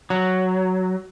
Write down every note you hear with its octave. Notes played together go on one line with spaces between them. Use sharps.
F#3